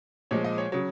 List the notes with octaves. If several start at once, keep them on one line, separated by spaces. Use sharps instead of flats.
A#2 F3 G#3 C#5
D#5
C#5
C#3 F#3 C#5